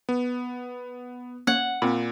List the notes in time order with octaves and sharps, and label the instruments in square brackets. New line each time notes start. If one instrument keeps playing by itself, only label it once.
[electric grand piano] B3
[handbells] A#3 C#4 C#5 [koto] F#5
[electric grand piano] A#2 [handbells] C4 B5